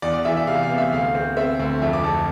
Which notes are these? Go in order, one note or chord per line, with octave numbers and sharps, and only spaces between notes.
E2 D5
D5
E3 E5
E5
C3 F5
F5
B3
E5
D2 F5
C4
C4 E5
D2
F2 E5
D6
F2 A5